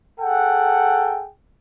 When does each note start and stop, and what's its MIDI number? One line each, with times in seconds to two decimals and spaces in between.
0.20 1.26 68
0.20 1.26 69
0.20 1.26 78
0.20 1.26 79